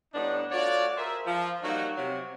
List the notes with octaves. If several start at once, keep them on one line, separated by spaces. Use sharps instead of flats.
A2 G3 B3 D4 D#4 F#5
A3 F4 F#4 C#5 D5
G#4 A#4 C5 E5
F3
F#3 G3 A#3 D#4 F#4
C3 F#3